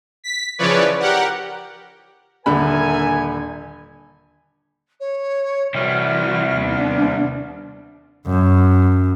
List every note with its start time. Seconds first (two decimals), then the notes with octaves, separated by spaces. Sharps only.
0.24 B6
0.58 C#3 E3 F3 B4 C#5 D5
1.00 G4 A#4 F#5
2.46 D#1 D3 A#4 E5 G#5 B5
5.00 C#5
5.75 C3 E3 G3 E4 F#4 F6
6.58 D#2 B3 D4
8.27 F#2